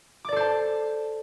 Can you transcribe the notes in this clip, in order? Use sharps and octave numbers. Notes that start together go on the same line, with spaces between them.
A4 C5 D5 A5 D6